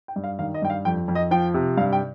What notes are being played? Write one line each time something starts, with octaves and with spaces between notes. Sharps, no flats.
G5
G2
F5
D#3 F5
D#5
G2 G5
F5
F2 G5
F2
D#5
F3 G5
C3
G2 F5
G5